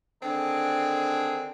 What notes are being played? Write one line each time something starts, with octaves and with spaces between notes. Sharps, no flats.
D3 D#3 C4 D4 G#4